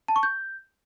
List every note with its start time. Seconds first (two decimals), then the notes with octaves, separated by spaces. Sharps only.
0.08 A5
0.16 C#6
0.23 G6